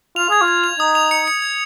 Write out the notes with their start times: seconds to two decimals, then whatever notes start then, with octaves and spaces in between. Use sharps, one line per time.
0.16 F4 F7
0.29 G#4 G#6
0.41 F4
0.48 G#6
0.64 F7
0.79 D#4 D#6
0.95 F7
1.11 C#7
1.28 C#7
1.42 G#6